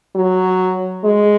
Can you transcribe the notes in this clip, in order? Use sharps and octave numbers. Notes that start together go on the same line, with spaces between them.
F#3
G#3